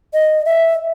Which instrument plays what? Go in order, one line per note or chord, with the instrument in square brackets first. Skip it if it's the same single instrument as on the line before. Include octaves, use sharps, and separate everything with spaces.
[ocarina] D#5
E5